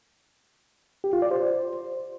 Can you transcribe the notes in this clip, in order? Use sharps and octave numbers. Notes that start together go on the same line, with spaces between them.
G4
F4
D5
C5